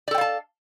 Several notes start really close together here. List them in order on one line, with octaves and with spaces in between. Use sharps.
D5 A4 G5 F5 A5